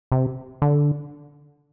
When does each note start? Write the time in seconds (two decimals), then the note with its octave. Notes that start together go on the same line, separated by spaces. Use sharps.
0.12 C3
0.62 D3